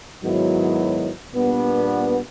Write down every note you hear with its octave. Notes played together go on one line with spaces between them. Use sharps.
G#2 D#3 F#3 B3 E4
A#2 G3 B3 D4